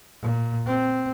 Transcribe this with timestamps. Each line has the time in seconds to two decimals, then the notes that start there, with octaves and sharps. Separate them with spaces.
0.22 A#2
0.67 C4